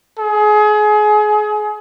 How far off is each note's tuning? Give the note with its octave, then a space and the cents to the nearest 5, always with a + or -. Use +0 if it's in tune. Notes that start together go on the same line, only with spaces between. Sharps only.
G#4 +30